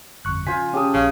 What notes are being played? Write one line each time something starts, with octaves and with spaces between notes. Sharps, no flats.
G1 F2 C#6 F#6
C#3 F3 F4 C5 G#5 B6
C#4 G4 G#4 A5 D#6
A#1 C#3 F3